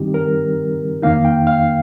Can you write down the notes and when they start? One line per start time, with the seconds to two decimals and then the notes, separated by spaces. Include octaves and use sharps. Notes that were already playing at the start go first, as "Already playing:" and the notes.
Already playing: G2 D#3 G3 C4 D#4 G4
0.14 A#4
1.02 F2 D#3 A#3 D#4 F5
1.25 G5
1.47 F5